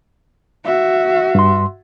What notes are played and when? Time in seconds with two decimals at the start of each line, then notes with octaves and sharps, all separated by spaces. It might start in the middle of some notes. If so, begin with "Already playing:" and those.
0.64 F#4 E5
1.35 G2 C6